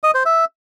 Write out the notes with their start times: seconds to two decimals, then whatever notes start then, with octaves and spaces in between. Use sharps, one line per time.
0.04 D#5
0.14 C5
0.25 E5